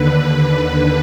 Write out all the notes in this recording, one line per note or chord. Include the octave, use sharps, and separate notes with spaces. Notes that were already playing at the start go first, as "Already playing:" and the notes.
Already playing: D#2 D3 B4
B4
B4